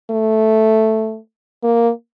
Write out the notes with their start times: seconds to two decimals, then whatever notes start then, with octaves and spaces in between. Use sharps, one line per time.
0.10 A3
1.63 A#3